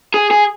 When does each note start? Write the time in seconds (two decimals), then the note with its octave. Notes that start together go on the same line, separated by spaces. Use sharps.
0.14 G#4
0.31 G#4